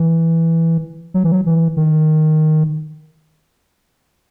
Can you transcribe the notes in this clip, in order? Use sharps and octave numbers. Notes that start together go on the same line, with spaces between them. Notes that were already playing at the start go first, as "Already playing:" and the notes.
Already playing: E3
F#3
E3
F#3
E3
D#3